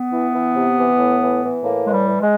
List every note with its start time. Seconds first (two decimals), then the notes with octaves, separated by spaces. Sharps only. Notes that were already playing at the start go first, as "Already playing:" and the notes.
Already playing: B3
0.12 E3
0.34 E3
0.56 C3
0.77 E3
0.99 A2
1.21 E3
1.42 E3
1.64 A2 A#3
1.86 E3 G#3
1.93 G3
2.07 E3
2.21 G#3